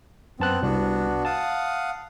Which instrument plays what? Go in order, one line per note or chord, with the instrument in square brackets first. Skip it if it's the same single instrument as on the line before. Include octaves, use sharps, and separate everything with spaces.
[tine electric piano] F#2 A5 F#6 [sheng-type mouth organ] B3 C4
[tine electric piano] C2 [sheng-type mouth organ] B3 D4 F#4
[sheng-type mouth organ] F5 F#5 D#6 [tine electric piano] A5